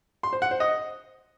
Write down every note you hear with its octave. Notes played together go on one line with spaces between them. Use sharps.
C6
C5
F#5
C5
D#5